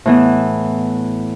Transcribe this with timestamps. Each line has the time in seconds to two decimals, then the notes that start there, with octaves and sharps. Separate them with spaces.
0.06 A2 E3 B3